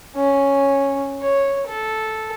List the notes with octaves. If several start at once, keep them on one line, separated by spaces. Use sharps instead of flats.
C#4
C#5
A4